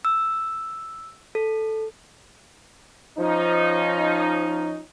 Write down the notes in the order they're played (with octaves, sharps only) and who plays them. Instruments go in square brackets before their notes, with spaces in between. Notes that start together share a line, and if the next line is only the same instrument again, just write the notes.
[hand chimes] E6
A4
[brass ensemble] F3 C#4 D#4